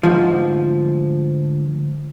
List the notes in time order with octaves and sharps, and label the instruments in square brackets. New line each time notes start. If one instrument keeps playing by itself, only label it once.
[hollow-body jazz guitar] D2 G#2 F3